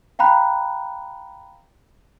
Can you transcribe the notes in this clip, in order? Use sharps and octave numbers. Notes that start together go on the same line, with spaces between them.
F5 G5 A#5 B5 F#6